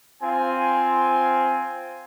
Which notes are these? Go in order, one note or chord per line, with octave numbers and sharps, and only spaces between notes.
C4 F4 G#5